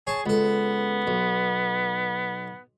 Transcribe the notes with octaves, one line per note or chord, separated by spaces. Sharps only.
G#4 C#5 A5
C#2 B3 A4
B1